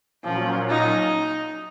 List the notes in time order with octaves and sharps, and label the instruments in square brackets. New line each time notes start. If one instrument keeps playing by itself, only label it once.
[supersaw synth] A#2 F#3 C#4 F4 [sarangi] F3
[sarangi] D#4